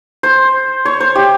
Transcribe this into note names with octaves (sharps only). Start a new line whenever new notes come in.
C5
C#5
C5
G4